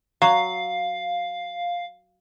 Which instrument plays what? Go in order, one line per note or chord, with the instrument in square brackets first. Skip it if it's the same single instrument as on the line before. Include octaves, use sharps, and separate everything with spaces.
[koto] F#3 [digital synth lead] F5